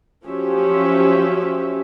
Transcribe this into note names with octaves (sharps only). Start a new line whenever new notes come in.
F3 F#3 C#4 G4 E5